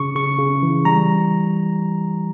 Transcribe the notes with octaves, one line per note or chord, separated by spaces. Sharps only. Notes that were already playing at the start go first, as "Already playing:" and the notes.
Already playing: C#3 C#6
C#3 C#6
C#3
E3
G3 A#5